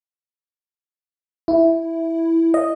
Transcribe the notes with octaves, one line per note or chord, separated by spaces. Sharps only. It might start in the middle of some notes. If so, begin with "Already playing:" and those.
E4
D#5